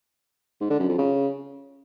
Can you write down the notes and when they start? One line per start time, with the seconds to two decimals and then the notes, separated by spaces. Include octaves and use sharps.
0.61 G#2
0.70 D3
0.80 F#2
0.89 F2
0.98 C#3